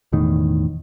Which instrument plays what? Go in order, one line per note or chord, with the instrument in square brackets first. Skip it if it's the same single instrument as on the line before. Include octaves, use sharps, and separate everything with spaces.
[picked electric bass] E1 E2 A2 D#3